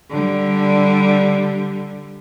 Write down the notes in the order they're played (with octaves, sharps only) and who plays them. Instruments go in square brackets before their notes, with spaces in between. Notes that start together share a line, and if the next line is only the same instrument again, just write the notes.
[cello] D3 G3